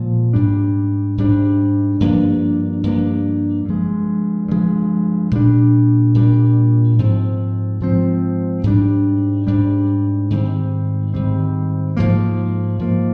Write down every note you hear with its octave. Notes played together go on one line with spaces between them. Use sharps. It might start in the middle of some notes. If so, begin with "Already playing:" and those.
Already playing: A#2 F3 G#3
G#2 G3 D4
G#2 G3 D4
G2 F3 A#3 D4
G2 F3 A#3 D4
G2 F3 G#3
G2 F3 G#3
A#2 G3 D4
A#2 G3 D4
G#2 F3 C4
G#2 F3 C4
G#2 G3 D4
G#2 G3 D4
G#2 D#3 G3 C4
G#2 D#3 G3 C4
G#2 F3 A#3
G#2 F3 A#3